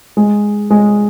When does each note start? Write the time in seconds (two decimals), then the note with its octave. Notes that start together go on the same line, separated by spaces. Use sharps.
0.17 G#3
0.70 G#3